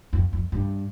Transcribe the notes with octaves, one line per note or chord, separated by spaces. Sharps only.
F2
F2
G2